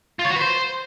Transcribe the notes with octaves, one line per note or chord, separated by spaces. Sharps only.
F4
C#5
F#4
B4
C5